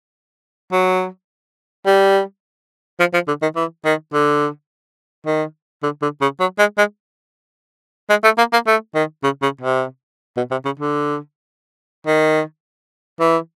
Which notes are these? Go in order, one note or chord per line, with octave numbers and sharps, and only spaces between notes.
F#3
G3
F3
F3
D3
D#3
E3
D#3
D3
D#3
D3
D3
C#3
F#3
G#3
G#3
G#3
A3
A#3
A#3
A3
D#3
C#3
C#3
C3
B2
C3
C#3
D3
D#3
E3